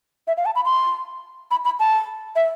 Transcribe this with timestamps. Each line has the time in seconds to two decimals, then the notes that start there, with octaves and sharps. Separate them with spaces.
0.27 E5
0.37 F5
0.46 A5
0.55 B5
0.65 C6
1.51 B5
1.65 B5
1.79 A5
2.36 E5